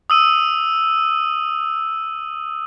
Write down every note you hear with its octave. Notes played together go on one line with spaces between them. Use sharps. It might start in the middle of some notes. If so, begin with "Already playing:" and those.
D#6 E6 D#7